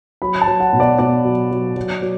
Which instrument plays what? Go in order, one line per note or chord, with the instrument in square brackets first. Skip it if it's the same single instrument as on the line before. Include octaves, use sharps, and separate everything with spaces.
[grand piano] F#3 B5
A5
F#3
F#5
B2
D5
B2 D5
F#3
F#3
F#3
F#3